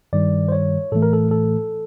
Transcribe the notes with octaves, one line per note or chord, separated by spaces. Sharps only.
G2 D#3 G3 D5
C5
C#5
A2 E3 A3 A4
A#4
A4
A4